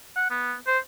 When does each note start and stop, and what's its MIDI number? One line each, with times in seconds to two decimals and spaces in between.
0.16 0.28 78
0.31 0.54 59
0.67 0.78 72